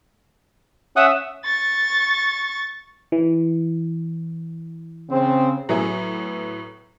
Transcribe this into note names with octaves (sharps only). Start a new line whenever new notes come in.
C#4 E5 F#5 D#6
C#6 A6
E3
C#3 C4
A2 F#3 B3 E4 G#4